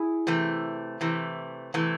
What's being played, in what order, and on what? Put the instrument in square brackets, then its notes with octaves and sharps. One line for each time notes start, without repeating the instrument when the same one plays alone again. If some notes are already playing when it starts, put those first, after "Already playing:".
Already playing: [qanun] E4 G#4
[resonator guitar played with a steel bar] C3 E3 A3
C3 E3 A3
C3 E3 A3